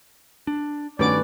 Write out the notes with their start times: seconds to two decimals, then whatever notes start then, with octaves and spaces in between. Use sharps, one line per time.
0.47 D4
0.99 G2 D#3 A3 C#4 F#4 B4 D5 D6